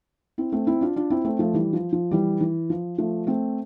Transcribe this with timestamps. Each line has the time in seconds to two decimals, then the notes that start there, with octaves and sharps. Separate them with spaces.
0.38 C4 E4
0.52 A3 C4
0.67 C4 E4
0.81 D4 F4
0.96 D4 F4
1.10 C4 E4
1.25 A3 C4
1.39 F3 A3
1.54 E3 G3
1.73 F3
1.93 F3
2.11 E3 G3
2.41 E3
2.70 F3
2.98 F3 A3
3.27 A3 C4